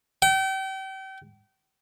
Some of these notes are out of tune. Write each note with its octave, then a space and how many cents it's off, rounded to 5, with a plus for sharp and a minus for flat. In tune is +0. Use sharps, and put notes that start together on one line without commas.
G5 -35